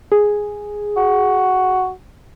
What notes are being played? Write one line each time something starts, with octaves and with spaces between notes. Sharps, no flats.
G#4
F#4